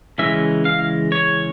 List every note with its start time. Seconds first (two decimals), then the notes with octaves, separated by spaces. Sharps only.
0.18 C#3 E3 G#3 C#4 E5
0.65 F5
1.12 C#5